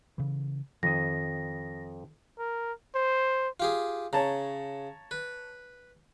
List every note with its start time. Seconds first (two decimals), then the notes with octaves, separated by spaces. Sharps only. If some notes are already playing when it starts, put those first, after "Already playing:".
0.18 C#3 E3
0.83 F2 D#3 F3 D#5 A#6
2.38 A#4
2.95 C5
3.60 F4 G4 G#4
4.13 C#3 C#5 A5 A#5
5.11 B4